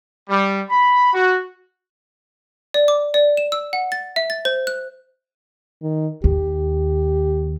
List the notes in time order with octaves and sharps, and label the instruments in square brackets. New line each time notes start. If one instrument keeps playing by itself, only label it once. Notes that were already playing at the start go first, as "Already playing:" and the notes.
[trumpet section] G3
B5
F#4
[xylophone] D5
D6
D5
E7
E6
F#5
A6
E5
A6
C5
F#6
[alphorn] D#3
[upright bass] D#2 [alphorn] G4